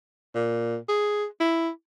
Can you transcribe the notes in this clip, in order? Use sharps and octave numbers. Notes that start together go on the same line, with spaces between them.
A#2
G#4
E4